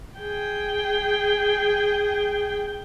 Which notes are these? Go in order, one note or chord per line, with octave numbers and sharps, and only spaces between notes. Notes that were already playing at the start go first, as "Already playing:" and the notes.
G#4 G5